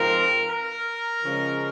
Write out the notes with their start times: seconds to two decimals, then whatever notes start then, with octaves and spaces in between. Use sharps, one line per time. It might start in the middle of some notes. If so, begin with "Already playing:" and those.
Already playing: G#2 F3 C4 A#4
0.48 A#4
1.23 C#3 F3 G#3 C#4